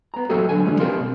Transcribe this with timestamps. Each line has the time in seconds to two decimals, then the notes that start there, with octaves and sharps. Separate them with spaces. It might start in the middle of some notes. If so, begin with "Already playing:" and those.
0.14 B3 A#5
0.29 F#3 A#3 F#4 G4 A4 C5
0.49 D3 F#3 G#5
0.65 D3 D#3 F3 G3 A3
0.80 B1 C4 G4 A#4 F5 C6